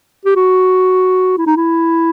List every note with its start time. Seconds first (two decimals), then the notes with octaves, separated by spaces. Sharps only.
0.25 G4
0.36 F#4
1.38 E4
1.47 D#4
1.57 E4